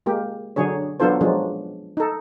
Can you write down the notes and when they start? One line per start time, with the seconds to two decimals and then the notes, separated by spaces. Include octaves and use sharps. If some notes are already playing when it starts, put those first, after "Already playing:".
0.06 G#3 A#3 G4
0.56 D3 F#3 D4 G#4 C#5
1.00 F#3 B3 D4 F4 A4 C5
1.21 F3 F#3 G#3 D4
1.97 D#4 A4